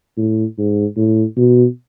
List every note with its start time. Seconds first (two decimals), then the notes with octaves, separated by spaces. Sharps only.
0.17 A2
0.58 G#2
0.97 A2
1.37 B2